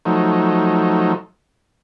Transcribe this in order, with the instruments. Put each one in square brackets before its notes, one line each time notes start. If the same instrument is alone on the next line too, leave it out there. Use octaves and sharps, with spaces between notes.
[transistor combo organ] F3 F#3 A3 D#4